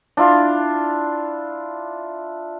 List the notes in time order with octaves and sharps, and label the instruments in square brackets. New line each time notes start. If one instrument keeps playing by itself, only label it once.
[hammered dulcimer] D4 E4 F4